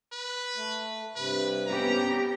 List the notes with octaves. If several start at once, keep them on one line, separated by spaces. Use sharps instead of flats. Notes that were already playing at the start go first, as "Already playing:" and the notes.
B4
A3
G2 C3 B4
B3 C#4 G4 A#5